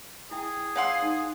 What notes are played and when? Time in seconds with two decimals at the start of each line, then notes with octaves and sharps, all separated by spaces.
0.31 E4 G#4 G5
0.76 C#5 F5 F#5 G#5 C6 E6
1.03 D#4